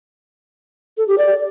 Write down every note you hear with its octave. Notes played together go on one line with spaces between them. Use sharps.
A4
G4
D5